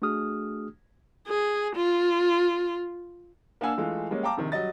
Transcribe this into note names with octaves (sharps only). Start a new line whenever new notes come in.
A3 D4 F#4 G#4 D#6 F6
G#4
F4
A#3 D4 F5 F#5 G#5 E6
E3 G#3 A3 F4
G3 G#3 A#3 C#4
F5 G5 A5 A#5 D6
A#1 C3 D#3
F#3 G3 D#5 A6